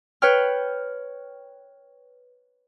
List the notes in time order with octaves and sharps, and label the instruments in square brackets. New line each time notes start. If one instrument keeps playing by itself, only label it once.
[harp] B4 C#5 G5 F6